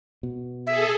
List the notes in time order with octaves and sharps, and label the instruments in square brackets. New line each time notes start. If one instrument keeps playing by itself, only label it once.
[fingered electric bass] B2
[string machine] G#4 A4 [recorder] E5